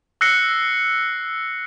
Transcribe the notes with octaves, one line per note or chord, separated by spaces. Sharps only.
E6 F#6 A#6 C7 C#7 G7